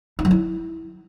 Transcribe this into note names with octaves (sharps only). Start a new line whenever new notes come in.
D#4
F#3
E4